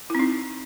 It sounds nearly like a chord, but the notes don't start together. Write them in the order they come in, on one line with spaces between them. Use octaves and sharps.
E4 C4 D#4